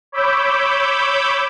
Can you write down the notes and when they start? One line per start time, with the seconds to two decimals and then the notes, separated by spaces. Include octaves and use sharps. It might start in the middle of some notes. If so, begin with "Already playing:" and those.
0.12 C#5 B5 D6 E6 G6